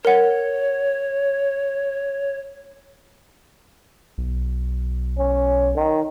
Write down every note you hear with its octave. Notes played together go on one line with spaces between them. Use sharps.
A#4 C#5 F#5
B1
C#4
D#3